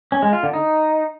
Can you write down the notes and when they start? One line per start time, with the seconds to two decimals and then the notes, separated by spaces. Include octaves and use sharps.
0.12 C#4
0.22 G#3
0.33 F4
0.43 D3
0.53 D#4